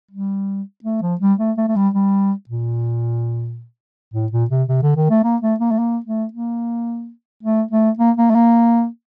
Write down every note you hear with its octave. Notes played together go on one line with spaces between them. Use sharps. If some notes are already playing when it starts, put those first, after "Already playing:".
G3
A3
F3
G3
A3
A3
A3
G3
G3
A#2
A2
A#2
C3
C3
D3
D#3
A3
A#3
A3
A#3
A3
A#3
A3
A#3
A3
A3
A#3
A#3
A3
A#3